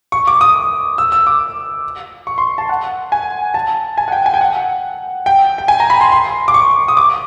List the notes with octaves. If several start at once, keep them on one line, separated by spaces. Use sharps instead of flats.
C#6
D6
D#6
E6
E6
D6
C#6
C6
A5
F#5
G#5
A5
G#5
F#5
G5
G#5
G5
F#5
G5
G5
G#5
A#5
B5
C6
C6
D6
C#6
D#6
D6